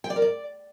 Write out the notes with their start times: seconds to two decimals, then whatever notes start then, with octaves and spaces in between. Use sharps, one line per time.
0.04 G5
0.10 D5
0.16 A#4
0.22 D5